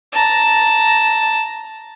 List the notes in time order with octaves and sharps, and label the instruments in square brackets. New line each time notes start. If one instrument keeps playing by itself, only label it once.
[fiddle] A5 A#5